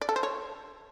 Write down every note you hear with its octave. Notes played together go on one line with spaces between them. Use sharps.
D5
A4
C5
C#5